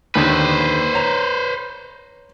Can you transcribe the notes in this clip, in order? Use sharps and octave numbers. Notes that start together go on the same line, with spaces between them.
D#2 D3 D#3 B4 C5
C#5 A#5